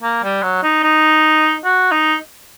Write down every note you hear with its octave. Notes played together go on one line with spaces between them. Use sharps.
A#3
G3
F#3
D#4
D#4
F#4
D#4